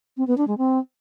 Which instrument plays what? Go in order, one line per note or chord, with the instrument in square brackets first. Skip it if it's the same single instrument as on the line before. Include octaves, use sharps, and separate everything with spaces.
[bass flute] C4
B3
D4
G#3
C4